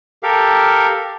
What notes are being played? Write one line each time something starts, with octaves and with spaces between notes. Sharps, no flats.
G4 A4 A#4 F5